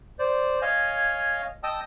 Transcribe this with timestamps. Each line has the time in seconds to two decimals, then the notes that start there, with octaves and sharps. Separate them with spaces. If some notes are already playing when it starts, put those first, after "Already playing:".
0.19 C5 D5
0.62 C#5 D#5 F5 G#5
1.63 D#5 G5 A5 D#6 E6